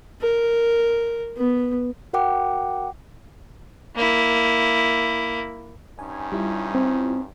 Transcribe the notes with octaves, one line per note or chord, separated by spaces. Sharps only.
A#4
B3
F#4 A#4 F#5 G5 D6
A#3 E4
G2 C#4 D#4 G#5
G3 E4 F4
C4